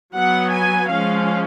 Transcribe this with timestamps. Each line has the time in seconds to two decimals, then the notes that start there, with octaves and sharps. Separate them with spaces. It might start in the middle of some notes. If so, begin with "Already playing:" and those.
0.15 F#3 B3 F#5
0.52 G#5
0.91 F3 G#3 C#4 F5